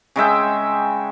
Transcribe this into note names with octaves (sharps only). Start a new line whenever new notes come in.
C#3 G#3 E5 G5